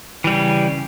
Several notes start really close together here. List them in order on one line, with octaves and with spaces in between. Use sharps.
E3 G3 C#3